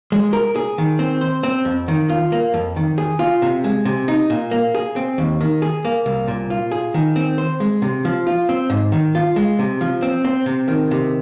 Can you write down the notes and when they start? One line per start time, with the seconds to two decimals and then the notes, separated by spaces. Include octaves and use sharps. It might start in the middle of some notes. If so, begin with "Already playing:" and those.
0.12 G#3
0.33 A#4
0.56 G#4
0.78 D#3
0.99 C4
1.21 C5
1.43 C4
1.65 F2
1.88 D#3
2.10 F4
2.32 A#3
2.54 F2
2.76 D#3
2.98 G#4
3.19 F4
3.42 C3
3.64 G#3
3.85 C3
4.08 D#4
4.30 A#2
4.51 A#3
4.75 G#4
4.96 C4
5.18 D#2
5.41 D#3
5.62 G#4
5.85 A#3
6.06 C2
6.28 A#2
6.50 F4
6.72 G#4
6.94 D#3
7.16 C4
7.38 C5
7.60 G#3
7.82 C3
8.05 F3
8.27 F4
8.49 C4
8.70 G#2
8.92 D#3
9.15 F4
9.36 G#3
9.59 C3
9.81 F3
10.02 C4
10.25 C4
10.46 C3
10.68 D#3
10.91 C3